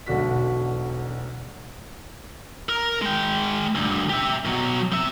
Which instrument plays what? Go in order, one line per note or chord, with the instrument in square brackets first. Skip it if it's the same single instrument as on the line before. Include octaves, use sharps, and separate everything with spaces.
[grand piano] E1 B1 D3 F#4 B6
[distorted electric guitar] A#4
G#3 G5
D2 G2
G4 E5
B2 F#3
C4 E5